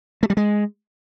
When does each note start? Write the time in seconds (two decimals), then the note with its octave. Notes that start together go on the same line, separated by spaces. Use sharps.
0.23 A3
0.30 G3
0.37 G#3